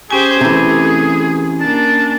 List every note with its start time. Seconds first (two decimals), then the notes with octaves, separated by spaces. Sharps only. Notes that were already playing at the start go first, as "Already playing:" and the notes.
0.11 C#4 G4 G#4 C5 G#5
0.41 C3 E3 A3
1.61 A#3 D4 A5